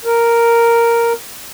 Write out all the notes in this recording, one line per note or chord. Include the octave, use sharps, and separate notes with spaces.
A#4